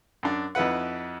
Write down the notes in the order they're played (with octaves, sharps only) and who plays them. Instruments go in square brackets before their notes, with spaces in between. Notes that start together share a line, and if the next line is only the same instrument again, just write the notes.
[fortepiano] F#2 D4
F2 D#4 E4 B4 F#5